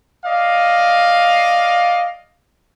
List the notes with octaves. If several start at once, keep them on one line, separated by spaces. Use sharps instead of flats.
D5 D#5 F5